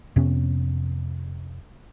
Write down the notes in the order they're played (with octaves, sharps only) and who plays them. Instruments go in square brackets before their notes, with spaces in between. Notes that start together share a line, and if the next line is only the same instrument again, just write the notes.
[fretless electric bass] F2 C3 B3 C#4